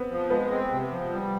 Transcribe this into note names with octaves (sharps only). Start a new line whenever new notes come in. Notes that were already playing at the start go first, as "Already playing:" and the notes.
Already playing: B3 C4 B4
F3
G#3 B3 B4
C4
C3
F3
G3